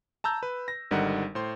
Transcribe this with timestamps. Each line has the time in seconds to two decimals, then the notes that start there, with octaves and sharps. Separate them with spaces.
0.24 A5 A#5 E6 G6
0.43 B4
0.68 A#6
0.91 G#1 D3 G3 D#4 A#4 F#5
1.35 A2 C5 C6